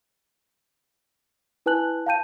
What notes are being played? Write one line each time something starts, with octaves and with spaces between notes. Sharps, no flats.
E4 B4 G#5 A5 F#6 F#7
F5 G5 A5 G6 D#7